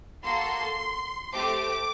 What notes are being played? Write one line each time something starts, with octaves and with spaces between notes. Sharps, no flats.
A#3 F#4 A4 C6
A3 C4 G4 D6